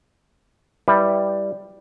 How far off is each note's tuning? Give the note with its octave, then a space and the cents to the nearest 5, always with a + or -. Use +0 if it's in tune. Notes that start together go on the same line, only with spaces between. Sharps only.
G3 +0 E4 +0 B4 +0